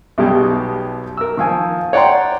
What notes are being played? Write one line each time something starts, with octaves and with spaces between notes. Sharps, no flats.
B1 B2 G3 G4 G#4
A#4 E6
D#3 F3 G#5
C#5 D5 F#5 G5 A#5 C6